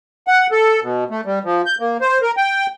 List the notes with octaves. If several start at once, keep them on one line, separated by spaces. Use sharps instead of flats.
F#5
A4
B2
A3
G3
F3
G6
A#3
C5
A#4
G5